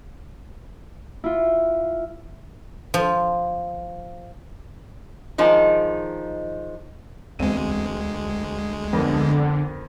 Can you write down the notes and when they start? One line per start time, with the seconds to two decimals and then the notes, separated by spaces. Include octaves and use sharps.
1.24 E4 F4
2.94 F3
5.38 D#3 F3 G#3 D#4
7.39 E1 D2 G#3 C4 D#7
8.93 F2 D3 B3 A#4